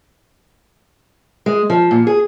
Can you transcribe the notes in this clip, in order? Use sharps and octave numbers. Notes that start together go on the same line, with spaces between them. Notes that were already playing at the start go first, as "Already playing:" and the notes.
G#3
F3
A#2
G#4